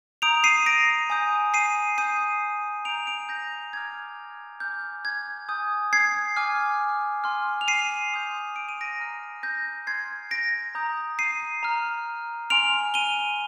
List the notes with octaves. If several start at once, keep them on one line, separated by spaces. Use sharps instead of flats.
A#5 D#6 G6 D7 F7
C7 D#7
A#6 D7
G#5 D#6 G6
C7 D#7
G#5 D#6 G6 C7 D#7
A#5 D#6 G6 D7 F7
D7 F7
G6 A#6
A#5 D6 F6 G#6
G#5 D6 F6 G6
G#6
G#5 D#6 G6
G#6 C7
G#5 D6 F6
G#5 C6 F6
F7
C7 D#7
C6 D#6 G6
D7
D#7
A#6 D7
A#5 F6
G6 A#6
C6 F6 G#6 C7
A#6 D7
A#5 D#6 G6
C7 D#7
A#5 F6
G#5 C6 F6 D7 F7
D#7 G7